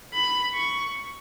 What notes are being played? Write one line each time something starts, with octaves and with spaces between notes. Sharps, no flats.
B5
C#6